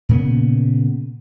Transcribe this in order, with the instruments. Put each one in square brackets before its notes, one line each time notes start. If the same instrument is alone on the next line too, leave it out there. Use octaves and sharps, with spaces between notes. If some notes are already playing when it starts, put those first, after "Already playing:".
[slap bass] A#2 C#3 A#3 B3